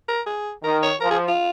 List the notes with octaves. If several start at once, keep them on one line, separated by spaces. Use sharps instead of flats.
A#4
G#4
D#3 A#4
C#5
F3 A#4
G#4
F4